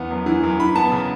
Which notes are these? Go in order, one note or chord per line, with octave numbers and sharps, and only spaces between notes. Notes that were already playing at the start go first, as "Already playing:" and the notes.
Already playing: E2 B3
F#2
E3
F#2
E3 B5
B3 A5
C#3